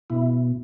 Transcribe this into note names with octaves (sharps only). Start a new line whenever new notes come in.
B2 E4